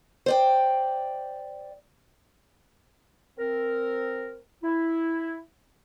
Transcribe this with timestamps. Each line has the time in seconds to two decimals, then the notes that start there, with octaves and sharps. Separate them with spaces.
0.26 C5 D5 G5
3.38 C4 A#4
4.64 E4